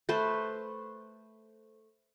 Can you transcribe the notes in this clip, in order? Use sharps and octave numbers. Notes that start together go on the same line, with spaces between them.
A3 A4 B4 C5